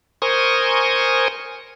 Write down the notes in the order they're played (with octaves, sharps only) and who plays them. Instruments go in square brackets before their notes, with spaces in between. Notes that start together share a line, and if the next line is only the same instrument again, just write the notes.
[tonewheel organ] A#4 C5 G#5 C#6 D#6